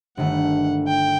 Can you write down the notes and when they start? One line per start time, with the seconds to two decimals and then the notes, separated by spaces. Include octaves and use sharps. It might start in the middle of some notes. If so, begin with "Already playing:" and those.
0.17 G1 G2 D#3 A3 F#5
0.88 G5